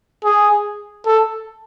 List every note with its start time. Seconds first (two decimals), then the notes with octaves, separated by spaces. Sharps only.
0.24 G#4
1.06 A4